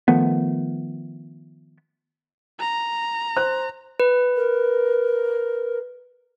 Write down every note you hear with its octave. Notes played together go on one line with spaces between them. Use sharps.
D#3 F3 A3 B3
A#5
C5 F#6
B4
A#4